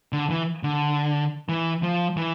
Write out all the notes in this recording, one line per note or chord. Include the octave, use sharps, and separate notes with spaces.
D3
E3
D3
E3
F3
E3